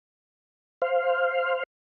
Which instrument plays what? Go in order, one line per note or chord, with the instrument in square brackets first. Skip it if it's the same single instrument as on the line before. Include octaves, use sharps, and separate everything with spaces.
[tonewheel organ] C5 F5